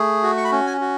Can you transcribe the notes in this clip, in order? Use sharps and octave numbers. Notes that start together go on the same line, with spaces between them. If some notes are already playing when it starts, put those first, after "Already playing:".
Already playing: A3 G#4
F#4
C#6
B5
C#4
G#5
F#4